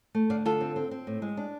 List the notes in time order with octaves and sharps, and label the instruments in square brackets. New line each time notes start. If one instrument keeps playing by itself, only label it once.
[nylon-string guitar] A3
D3 D5 F5
D3 F4 A4
C4
C4
C4
A2
G#3
D4